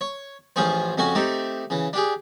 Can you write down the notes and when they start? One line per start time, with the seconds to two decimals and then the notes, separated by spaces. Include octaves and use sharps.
0.01 C#5
0.56 A1 F3 C#4 F4 G#4 C5
0.97 F2 C#3 C#4 F#4 G#5
1.15 A3 C4 D#4 G4 A4
1.70 C#3 E3
1.93 D4 G4 G#4